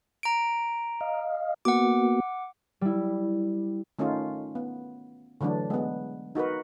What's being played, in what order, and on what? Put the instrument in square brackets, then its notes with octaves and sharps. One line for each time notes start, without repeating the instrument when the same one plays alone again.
[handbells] A#5 D7
[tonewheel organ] D#5 F5
[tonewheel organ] A#3 B3 F#4 [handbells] F#5 D6
[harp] G3 E4
[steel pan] D#3 A3 C#4 D#4 F4
B3
D3 E3 F#3 A3 D4
G#3 B3
D#4 F#4 A#4 B4